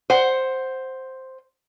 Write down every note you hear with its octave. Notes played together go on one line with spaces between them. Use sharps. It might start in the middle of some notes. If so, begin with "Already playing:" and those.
C5 F#5